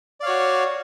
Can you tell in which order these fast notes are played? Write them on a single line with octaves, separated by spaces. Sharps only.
D5 F5 C#5 F#4